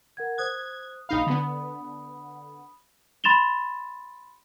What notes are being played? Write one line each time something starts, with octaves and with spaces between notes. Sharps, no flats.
A#4 F#5 G#6
C5 D#6 F#6 G#6
A#1 D#4 F5 B5 D#6
D3 B3
B5 C6 A6 E7 F7 G7